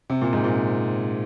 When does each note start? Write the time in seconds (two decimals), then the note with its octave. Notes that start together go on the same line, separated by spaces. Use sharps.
0.10 C3
0.22 A#2
0.33 G#2
0.44 A#2